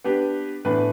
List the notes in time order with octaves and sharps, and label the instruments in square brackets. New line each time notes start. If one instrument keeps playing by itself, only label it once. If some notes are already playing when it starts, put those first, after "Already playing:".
[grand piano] B3 D4 G4 B4
A2 E3 B3 D4 B4